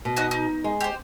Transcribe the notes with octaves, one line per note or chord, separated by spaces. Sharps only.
B2
D#4 F#4 D#5
D#4
G#3
G4 C5